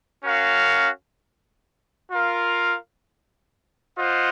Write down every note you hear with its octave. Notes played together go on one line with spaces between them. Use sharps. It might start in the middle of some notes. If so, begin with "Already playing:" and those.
C#4 F#4 A#4 F5
F4 A#4 F5
F4 C5 D#5 F#5